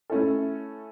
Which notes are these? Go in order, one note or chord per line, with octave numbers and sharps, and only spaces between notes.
A3 C#4 E4 A4